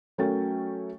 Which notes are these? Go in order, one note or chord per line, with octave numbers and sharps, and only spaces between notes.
F#3 A3 C#4 A#4 G5 A6